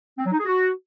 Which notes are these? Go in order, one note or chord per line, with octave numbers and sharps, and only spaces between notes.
C4
F#3
D#4
G#4
F#4